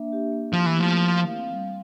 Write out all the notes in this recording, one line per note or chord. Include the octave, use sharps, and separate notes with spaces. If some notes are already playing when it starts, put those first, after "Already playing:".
Already playing: A#3 D4 E5
G4
A#3
F3 E4
E3
A3
F3
A#4
F5
C4
G3